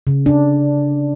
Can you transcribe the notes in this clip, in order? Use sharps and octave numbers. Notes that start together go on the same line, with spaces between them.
C#3
D4